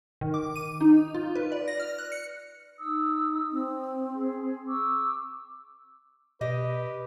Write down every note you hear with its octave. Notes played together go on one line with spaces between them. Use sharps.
D#3
D6
D#7
D#4
F4
B4
D5
A#6
F6
F#6
C#7
D#4 D#6 E6
C4
G#4
C#6 D6 E6
B2 G4 B4 D#5